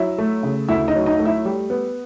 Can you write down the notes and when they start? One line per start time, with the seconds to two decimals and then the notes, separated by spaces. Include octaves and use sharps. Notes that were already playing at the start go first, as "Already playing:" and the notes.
Already playing: F#3 E4 E5
0.18 A3
0.43 C#3
0.68 D2 E4 E5
0.88 D#4 D#5
0.95 F#3
1.06 D#4 D#5
1.19 A3
1.25 E4 E5
1.45 G3
1.70 B3